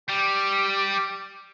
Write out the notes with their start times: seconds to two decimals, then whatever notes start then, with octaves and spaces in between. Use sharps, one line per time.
0.09 G3 G4